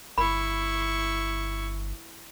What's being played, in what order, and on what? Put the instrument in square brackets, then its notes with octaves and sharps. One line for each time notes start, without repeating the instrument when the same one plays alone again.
[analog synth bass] G1 [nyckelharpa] E4 C#6 [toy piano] B5